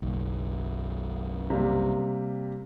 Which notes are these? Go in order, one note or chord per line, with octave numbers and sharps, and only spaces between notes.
F#1 B1
C3 G3 A#3